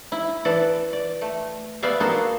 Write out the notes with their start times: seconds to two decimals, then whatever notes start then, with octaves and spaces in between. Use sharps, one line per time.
0.12 E4
0.45 E3 A4 D5
0.93 D5
1.21 A3
1.83 B3 G#4 D5 E5 F5
2.00 A#3 B3 F#4 G#4 A4